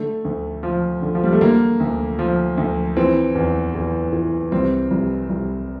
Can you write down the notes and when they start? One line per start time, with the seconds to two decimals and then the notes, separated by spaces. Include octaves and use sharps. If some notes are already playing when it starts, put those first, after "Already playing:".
Already playing: D3 A3
0.25 D2
0.63 F3
1.02 D3
1.15 F3
1.24 G3
1.33 A3
1.41 D3 A#3
1.80 D2
2.19 F3
2.57 D2
2.97 E3 C4
3.35 E2
3.75 E2
4.13 E3
4.52 C2 C4
4.91 C2
5.29 C2